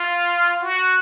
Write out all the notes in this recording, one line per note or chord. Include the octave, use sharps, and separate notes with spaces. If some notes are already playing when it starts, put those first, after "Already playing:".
Already playing: F4
F#4